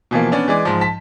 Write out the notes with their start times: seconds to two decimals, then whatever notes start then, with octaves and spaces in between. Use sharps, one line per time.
0.11 B2 E3 F3 A#3
0.32 B3 C#4 D4 D5
0.48 E3 G#3 D5 D6
0.65 G#2 F3
0.81 A5 B6